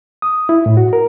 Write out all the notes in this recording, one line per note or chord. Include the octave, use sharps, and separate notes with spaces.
D#6
E4
A2
F#4
A#4